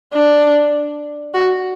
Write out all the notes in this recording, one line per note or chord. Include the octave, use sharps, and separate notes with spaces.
D4
F#4